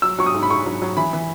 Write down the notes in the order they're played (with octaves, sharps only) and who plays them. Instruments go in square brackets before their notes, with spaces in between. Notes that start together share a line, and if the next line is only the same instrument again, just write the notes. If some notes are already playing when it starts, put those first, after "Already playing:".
[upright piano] F#3 E6
F#3 C#6
D#6
G#2
B5
G#2 C#6
F#3
F#3
E3 B5
E3